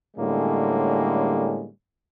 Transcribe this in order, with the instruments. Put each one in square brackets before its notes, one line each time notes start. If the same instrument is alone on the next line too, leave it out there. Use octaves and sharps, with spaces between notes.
[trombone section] A2 D3 G3 G#3 A#3 C#4